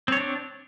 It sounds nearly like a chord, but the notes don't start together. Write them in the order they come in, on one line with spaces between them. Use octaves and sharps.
C4 C#5 D4